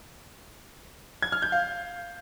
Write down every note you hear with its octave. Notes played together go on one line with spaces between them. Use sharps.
G#6
F6
G6
F5